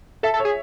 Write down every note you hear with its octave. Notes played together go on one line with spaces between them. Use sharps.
A4 E5
A4
C#5
G#4